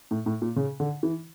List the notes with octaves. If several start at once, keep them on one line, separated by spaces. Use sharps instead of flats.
A2
A2
A#2
C#3
D3
E3